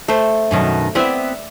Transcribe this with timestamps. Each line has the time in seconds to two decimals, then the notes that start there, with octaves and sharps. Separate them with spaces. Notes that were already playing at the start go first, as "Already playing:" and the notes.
0.08 A3 C5
0.51 F#2 B2 D#3
0.95 B3 C4 E4 D5 E5